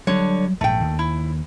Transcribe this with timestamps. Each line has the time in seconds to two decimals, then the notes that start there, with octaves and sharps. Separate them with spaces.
0.07 D3 F#3 G3 C#5
0.61 A#1 G#2 A3 G5
0.81 D#2
0.99 E4